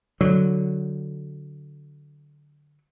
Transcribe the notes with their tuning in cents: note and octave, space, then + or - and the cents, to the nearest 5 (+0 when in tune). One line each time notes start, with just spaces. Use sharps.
D3 +0 F#3 +0